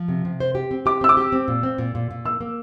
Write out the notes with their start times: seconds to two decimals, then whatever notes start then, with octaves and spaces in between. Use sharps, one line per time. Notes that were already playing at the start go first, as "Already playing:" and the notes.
Already playing: F3
0.08 C3
0.25 C3
0.40 C5
0.55 G4
0.71 C4
0.86 G4 D6
1.01 C4 E6
1.09 D6
1.17 G4
1.32 C4
1.48 A#2
1.63 C4
1.78 A#2
1.95 A#2
2.11 A#2
2.25 A#3 E6
2.41 A#3